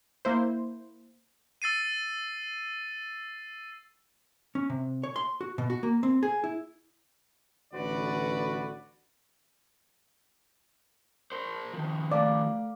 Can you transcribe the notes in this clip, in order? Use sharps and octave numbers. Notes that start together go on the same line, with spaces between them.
A#3 E4 C5
E6 A6 C7 D#7
C#4
C3
C#5
C6
F#4
B2
F#4
A#3
C4
G#4
E4
A1 D3 F#4 B4 D5
A#4 C5
D#3 F3
A3 D5 F5 D6